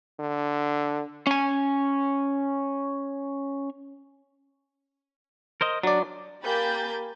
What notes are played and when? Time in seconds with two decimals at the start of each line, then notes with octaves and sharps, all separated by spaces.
0.20 D3
1.27 C#4 G#5
5.61 A#4 C5 D#5
5.83 F#3 D4 D5
6.42 A#3 G4 G#5 B5 G6 A6